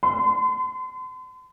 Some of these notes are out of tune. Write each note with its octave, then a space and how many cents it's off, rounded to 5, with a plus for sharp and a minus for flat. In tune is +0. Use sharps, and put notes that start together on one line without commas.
C6 -40